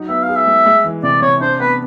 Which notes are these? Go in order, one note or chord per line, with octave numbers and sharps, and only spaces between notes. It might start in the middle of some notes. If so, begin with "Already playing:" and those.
Already playing: F#3 D#4
B3 E5
F5
G#4
E5
G#3
G#3
E3
C3 D5
C3 C#5
D4 C5
B3 B4